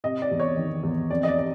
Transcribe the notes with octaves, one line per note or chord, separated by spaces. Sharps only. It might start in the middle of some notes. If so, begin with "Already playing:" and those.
C3 D#5
D5
E2
C#5
D#3
E2
F2 D5
D#5
D5
D5